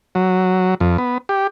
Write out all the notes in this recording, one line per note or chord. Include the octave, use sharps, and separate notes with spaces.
F#3
F2
B3
G4